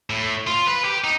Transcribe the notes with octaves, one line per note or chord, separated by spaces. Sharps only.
A2
F4
B4
G4
D#4